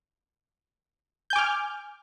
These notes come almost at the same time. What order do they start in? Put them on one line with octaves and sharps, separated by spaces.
G6 G#5 D6 F6